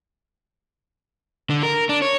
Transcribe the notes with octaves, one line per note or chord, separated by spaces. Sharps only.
D3
A#4
D4
C#5